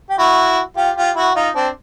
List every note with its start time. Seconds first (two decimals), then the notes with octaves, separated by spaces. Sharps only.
0.10 G4
0.18 E4 F#4
0.77 F4 G4
0.97 F4 G4
1.16 E4 F#4
1.35 D#4 F4
1.55 C4 D4